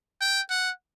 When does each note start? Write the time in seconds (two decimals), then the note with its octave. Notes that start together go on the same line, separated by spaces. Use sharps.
0.21 G5
0.50 F#5